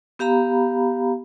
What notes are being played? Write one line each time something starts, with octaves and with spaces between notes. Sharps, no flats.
B3 G4 F5 A#5 B5